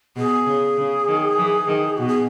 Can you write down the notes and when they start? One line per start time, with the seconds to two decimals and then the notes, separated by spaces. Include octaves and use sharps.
0.16 B2 G#4
0.46 C#3
0.77 C#3
1.08 D#3
1.38 E3
1.67 D#3
1.97 B2 F#4
2.08 G#4